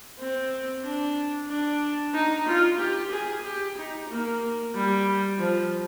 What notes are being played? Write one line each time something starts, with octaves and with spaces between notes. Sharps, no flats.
C4
D4
D4
D#4
F4
G4
G#4
G4
D#4
A#3
G3
F3